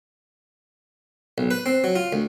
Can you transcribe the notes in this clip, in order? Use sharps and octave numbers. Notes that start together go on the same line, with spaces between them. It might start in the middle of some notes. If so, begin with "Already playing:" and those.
B1
B4
C4
F#3
F4
D2